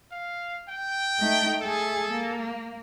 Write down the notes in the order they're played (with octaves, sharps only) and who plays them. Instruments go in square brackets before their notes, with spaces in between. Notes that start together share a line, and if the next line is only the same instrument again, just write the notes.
[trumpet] F5
G5
[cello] A3 D#4
[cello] A3 G#4 [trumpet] A4
[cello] A#3